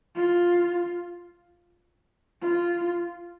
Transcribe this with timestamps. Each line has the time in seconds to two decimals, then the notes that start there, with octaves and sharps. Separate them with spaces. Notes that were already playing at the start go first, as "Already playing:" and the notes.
0.15 F4
2.41 F4